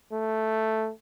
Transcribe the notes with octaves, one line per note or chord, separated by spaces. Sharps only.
A3